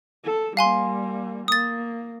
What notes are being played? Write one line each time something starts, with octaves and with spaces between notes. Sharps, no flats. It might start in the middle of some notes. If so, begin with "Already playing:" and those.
A4
G3 A#3 F5 G#5 C6
A#3 D#6 A6